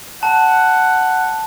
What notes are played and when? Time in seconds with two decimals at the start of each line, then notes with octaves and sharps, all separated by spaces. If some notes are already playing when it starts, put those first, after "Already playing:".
0.23 F#5 A5